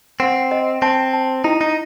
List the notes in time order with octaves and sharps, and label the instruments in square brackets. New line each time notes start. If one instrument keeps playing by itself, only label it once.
[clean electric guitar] C4 [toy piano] F#5
[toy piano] D#5
[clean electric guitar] C4 [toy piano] A5
[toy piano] A5
[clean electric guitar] D#4 [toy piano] E4
[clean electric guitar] D#4